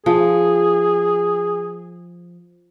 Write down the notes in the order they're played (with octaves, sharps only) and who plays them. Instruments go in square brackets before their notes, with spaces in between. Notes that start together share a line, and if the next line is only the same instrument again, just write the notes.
[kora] F3 [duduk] G#4